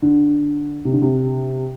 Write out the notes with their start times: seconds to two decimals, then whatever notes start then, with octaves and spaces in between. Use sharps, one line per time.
0.02 D3
0.85 C3
0.93 D3
1.02 C3